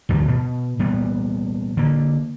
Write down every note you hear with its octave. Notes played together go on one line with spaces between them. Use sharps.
D2 G2 D#3 F#3
B2
A#2 G3 B3
D3 A#3